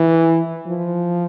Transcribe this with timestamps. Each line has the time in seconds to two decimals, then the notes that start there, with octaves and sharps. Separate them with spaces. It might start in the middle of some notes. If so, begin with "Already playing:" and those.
Already playing: E3
0.67 F3